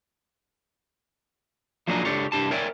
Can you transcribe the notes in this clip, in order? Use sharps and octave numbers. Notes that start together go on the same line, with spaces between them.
F3 F#3 A#3 D4 D#4 G#4
C#2 D4 G4 A4 C#5
C2 D4 G4 A5
A#4 C#5 D5 E5 G5 G#5